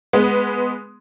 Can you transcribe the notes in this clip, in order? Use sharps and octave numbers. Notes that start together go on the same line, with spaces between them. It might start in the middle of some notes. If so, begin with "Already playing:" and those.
G#3 B3